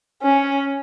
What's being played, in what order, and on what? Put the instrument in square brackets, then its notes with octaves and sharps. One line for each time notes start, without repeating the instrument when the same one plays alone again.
[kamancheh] C#4